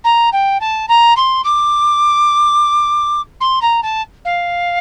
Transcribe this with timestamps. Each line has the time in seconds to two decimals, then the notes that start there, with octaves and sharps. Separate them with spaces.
0.04 A#5
0.33 G5
0.61 A5
0.88 A#5
1.17 C6
1.44 D6
3.41 C6
3.62 A#5
3.83 A5
4.25 F5